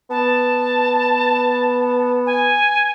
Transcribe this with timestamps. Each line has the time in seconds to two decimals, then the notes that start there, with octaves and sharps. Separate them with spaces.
0.10 B3 A5
2.26 G#5